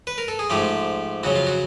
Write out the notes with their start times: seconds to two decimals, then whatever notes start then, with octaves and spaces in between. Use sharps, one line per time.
0.07 B4
0.18 A#4
0.28 A4
0.39 G#4
0.50 G#2 F3 A3 G4
1.23 F2 C#3 F#3 F#4
1.36 F4
1.47 F#4